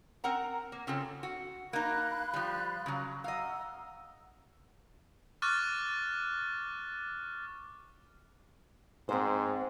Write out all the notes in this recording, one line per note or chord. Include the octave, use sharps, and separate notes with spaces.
C4 A#4 F#5 A#5
A#3
C#3 C4 F4 A4 G#5
F#4
A#3 D#4 F5 B5 F#6
F3 G3
C#3 F#3
D#5 F5 F#5 A#5 E6
C#6 D6 F6 F#6 A6
G#2 C4 C5